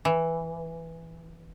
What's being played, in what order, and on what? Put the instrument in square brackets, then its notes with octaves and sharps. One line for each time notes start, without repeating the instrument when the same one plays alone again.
[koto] E3